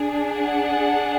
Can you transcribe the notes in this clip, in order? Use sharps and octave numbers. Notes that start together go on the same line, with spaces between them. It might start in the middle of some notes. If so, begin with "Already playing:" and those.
Already playing: D4 G#4
F#5